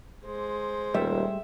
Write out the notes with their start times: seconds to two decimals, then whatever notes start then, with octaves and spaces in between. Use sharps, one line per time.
0.25 G#3 C5
0.94 D#1 G3 A3 E5